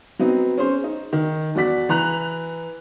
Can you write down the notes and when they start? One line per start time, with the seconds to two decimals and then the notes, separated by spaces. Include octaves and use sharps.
0.19 F#3 B3 C4 D#4
0.58 C#4 G#4 C5
0.84 D#4
1.13 D#3
1.55 E2 F#3 F#4 D5 B6
1.89 E3 A#5 F#6 F7